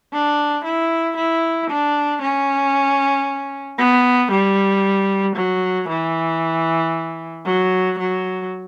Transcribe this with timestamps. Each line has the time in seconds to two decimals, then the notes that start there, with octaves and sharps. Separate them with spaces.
0.13 D4
0.65 E4
1.17 E4
1.70 D4
2.21 C#4
3.79 B3
4.31 G3
5.36 F#3
5.89 E3
7.46 F#3
7.98 F#3